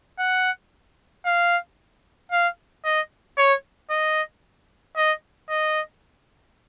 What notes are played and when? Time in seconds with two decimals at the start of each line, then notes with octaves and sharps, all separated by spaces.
0.19 F#5
1.25 F5
2.32 F5
2.85 D#5
3.38 C#5
3.90 D#5
4.96 D#5
5.49 D#5